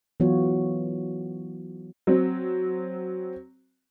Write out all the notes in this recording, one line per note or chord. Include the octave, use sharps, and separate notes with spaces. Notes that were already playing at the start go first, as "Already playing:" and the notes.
E3 F#3 B3 F4 F#4 C#5
F#3 C4